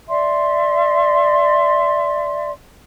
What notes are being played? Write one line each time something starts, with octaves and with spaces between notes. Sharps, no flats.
D5 E5 C6